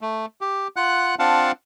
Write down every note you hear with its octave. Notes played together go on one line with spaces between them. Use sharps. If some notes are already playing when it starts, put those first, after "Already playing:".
A3
G4
F4 F#5 F#6
C4 D4 F4 F5 F#5 A5